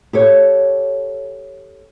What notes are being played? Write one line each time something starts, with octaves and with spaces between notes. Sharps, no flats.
G4 A4 C#5